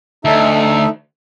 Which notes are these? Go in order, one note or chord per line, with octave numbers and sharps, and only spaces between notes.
D2 D#4 A4 E5